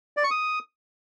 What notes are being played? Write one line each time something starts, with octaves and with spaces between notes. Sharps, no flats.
D5
C#6
D#6